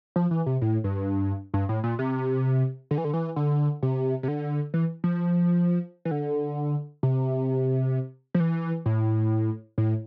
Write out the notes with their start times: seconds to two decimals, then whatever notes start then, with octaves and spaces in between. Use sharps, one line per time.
0.16 F3
0.31 E3
0.46 C3
0.62 A2
0.84 G2
1.54 G2
1.69 A2
1.84 A#2
1.99 C3
2.91 D3
2.98 E3
3.04 D3
3.13 E3
3.36 D3
3.83 C3
4.23 C3
4.28 D3
4.74 E3
5.04 F3
6.05 E3
6.11 D3
7.03 C3
8.35 F3
8.40 E3
8.86 A2
9.78 A2